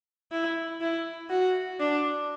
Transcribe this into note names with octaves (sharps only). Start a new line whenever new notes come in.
E4
E4
F#4
D4